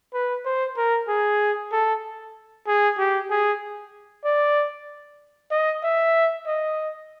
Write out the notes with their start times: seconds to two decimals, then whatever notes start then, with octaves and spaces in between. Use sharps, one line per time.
0.14 B4
0.45 C5
0.77 A#4
1.08 G#4
1.72 A4
2.67 G#4
2.98 G4
3.30 G#4
4.25 D5
5.51 D#5
5.83 E5
6.47 D#5